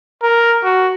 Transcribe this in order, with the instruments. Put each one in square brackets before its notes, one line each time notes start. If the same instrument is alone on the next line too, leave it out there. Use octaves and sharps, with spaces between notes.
[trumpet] A#4
F#4